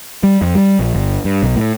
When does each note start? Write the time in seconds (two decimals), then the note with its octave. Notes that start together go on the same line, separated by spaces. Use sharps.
0.23 G3
0.42 F2
0.55 G3
0.79 A#1
0.94 G1
1.25 G2
1.43 B1
1.56 A2